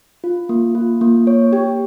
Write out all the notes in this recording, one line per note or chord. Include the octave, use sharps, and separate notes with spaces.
F4
A#3
F4
A#3
C#5
G4